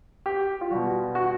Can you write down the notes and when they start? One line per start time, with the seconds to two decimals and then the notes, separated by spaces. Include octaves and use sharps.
0.26 G4
0.61 F4
0.71 B2 G3 F#4
1.15 F#4